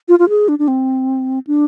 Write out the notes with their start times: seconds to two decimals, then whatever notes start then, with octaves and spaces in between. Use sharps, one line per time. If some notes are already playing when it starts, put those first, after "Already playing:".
0.08 F4
0.19 F4
0.29 G#4
0.48 D4
0.59 D4
0.68 C4
1.47 D4